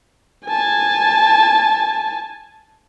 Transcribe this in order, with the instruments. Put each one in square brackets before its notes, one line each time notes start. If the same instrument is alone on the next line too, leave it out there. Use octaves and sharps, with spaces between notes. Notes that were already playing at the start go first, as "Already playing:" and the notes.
[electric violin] G#5 A5